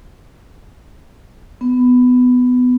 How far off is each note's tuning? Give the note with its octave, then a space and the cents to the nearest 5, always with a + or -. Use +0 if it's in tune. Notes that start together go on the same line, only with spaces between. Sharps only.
B3 +15